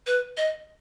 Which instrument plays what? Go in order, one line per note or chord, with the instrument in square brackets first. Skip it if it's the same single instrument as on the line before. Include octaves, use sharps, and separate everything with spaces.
[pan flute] B4
D#5